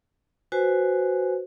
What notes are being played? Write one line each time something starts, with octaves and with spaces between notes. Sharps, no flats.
F#4 B4 C5 G#5